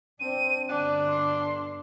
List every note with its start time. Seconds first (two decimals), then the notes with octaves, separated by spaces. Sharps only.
0.20 C4 D4 D#7
0.69 G1 D3 D4 F#6
1.08 C6